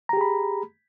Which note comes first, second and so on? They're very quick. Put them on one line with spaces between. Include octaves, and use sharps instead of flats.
A#5 G4 G#4 B5